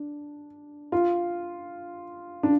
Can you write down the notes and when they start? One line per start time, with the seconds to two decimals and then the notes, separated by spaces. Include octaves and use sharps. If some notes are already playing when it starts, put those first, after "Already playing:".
Already playing: D4
0.92 F4
2.43 D4